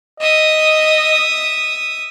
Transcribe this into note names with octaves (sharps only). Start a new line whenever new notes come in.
D#5 E5 D#6